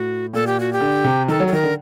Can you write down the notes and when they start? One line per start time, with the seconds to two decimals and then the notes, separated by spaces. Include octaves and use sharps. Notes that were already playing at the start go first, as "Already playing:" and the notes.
Already playing: A2 F#4
0.33 A#2 A4
0.47 G4
0.60 F#4
0.73 G4
0.81 D3
1.04 C3
1.28 D#3 A4
1.40 F#3
1.47 A4
1.52 D#3 A#4
1.63 D3